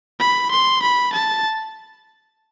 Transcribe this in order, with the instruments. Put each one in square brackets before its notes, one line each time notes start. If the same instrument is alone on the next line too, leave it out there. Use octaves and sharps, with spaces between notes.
[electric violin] B5
C6
B5
A5